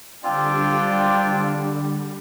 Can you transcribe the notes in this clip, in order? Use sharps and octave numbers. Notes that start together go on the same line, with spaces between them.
D3 G3 C4 D4 F4 D5 G5